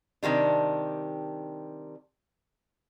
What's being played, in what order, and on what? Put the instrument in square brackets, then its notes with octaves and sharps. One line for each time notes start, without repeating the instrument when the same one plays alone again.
[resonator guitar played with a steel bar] C3 D#3 G3 D4